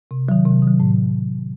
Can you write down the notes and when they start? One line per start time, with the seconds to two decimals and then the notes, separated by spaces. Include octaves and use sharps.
0.11 C3
0.29 D#3 F#3
0.46 C3
0.62 D#3 F#3
0.80 A2